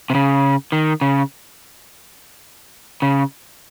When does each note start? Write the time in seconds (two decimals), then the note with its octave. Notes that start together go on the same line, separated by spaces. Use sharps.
0.10 C3
0.15 C#3
0.72 D#3
1.01 C#3
3.02 C#3